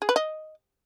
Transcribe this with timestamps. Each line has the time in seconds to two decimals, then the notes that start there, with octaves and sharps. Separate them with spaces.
0.02 G#4
0.09 B4
0.16 D#5